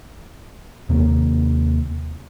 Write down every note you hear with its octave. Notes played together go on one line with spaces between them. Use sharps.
D#2 C3 A#3